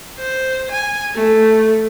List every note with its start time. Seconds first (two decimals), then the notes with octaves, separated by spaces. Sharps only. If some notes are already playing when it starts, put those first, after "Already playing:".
0.18 C5
0.71 G#5
1.15 A3